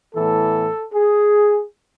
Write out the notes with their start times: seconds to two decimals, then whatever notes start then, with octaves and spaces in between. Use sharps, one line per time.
0.15 A2 E3 B3 A4
0.93 G#4